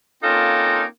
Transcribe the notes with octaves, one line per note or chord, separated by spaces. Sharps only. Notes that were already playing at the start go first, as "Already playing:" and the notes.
A#3 C4 C#4 D#4 F4 A4